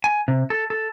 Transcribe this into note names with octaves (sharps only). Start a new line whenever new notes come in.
G#5
C3
A4
A4